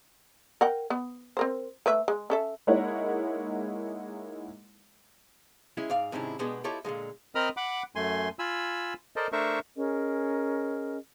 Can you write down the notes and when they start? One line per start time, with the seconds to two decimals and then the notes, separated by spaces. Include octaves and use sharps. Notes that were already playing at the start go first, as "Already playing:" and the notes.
0.61 A#4 F#5 G5
0.90 B3
1.37 C4 A#4 C5
1.86 A3 B4 E5
2.08 G#3
2.30 C#4 A4 E5
2.67 G#3 A#3 D#4 E4 C#5 F#5
5.77 G#3 C#4 E4
5.90 G#2 D5 F5
6.12 G#2 C3 D#3 C#4 D4 E4
6.39 B2 G#3 B3 D4 G4 G#4
6.64 E4 F4 G4 A4 C#5 D#5
6.85 A#2 D3 F3 G#3
7.35 C4 A#4 D#5 B5 D#6 F6
7.57 F#5 B5 D6
7.96 F#2 A3 G#5 C6
8.39 F4 G#5 B5 E6
9.16 A4 A#4 C5 D5 D#5
9.32 A3 D4 A#4 C5 E5 C#6
9.77 C#4 G#4 A#4 D#5